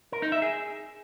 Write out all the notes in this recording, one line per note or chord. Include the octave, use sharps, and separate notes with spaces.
A#4
D#4
E5
G#4